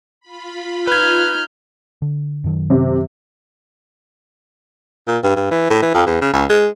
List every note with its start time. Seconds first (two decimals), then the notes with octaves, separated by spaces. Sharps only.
0.20 F4 B5
0.87 D#4 B4 F6 G6 G#6
2.02 D3
2.44 F#2 D#3 F#3
2.70 C3
5.07 A#2
5.23 G2
5.36 G2
5.51 E3
5.70 A2
5.82 E3
5.94 F2
6.06 E2
6.21 C#3
6.33 C#2
6.49 G#3